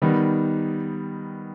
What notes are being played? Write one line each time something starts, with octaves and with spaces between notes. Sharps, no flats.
D#3 G3 B3 D#4